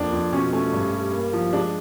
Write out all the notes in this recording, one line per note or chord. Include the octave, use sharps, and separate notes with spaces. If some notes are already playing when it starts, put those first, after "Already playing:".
Already playing: F2 A#3 D4
F2
B2 C#4
A3 C#4
G2
G3
A#3
F3
G#3 D4